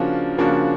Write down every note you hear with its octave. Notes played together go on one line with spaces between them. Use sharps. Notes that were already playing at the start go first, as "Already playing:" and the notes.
Already playing: C#3 F3 A#3 D4 F#4
C#3 F3 A#3 D4 F#4